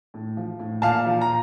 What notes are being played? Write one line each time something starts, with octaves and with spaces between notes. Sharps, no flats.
A2
F3
A2
A#2 F5 A5
F3
A#5